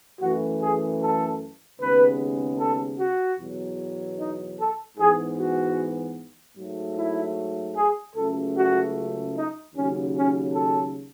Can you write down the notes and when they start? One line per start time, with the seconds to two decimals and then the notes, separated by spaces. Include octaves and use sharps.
0.21 F#2 E3 A3 F#4
0.60 G#4
1.00 A4
1.79 D#2 C#3 G#3 B3 B4
2.60 A4
2.99 F#4
3.38 E2 B2 F#3
4.19 D#4
4.59 A4
4.98 G#2 E3 B3 G#4
5.38 F#4
6.57 G#2 F#3 A3
6.97 E4
7.76 G#4
8.16 C#2 C#3 F#3 A3 A4
8.56 F#4
9.35 D#4
9.75 D#2 C#3 F#3 C#4
10.15 C#4
10.54 A4